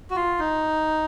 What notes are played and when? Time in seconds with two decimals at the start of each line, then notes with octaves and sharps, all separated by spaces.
0.10 F#4
0.16 F4
0.39 D#4